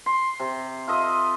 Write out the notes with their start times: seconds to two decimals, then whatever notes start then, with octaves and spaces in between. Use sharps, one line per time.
0.06 C6
0.40 C3
0.87 F4 A4 D#5 E5